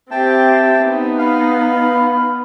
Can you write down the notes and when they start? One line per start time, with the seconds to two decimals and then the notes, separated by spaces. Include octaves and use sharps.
0.11 C4 G4 E5 G5 A5
0.82 B3 D#4
1.19 F5 B5